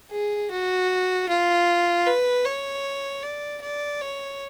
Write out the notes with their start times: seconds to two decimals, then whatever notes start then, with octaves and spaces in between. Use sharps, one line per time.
0.11 G#4
0.51 F#4
1.29 F4
2.06 B4
2.45 C#5
3.23 D5
3.61 D5
4.01 C#5